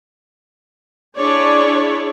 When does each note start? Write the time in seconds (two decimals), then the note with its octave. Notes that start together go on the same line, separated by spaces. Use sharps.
1.17 D4 E4 G#4 C#5 D5